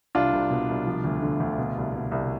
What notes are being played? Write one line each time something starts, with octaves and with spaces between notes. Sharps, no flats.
C2 D4 F4
C2
B2
C2
F3
D2
D3
D2
B2
C2
B2
C2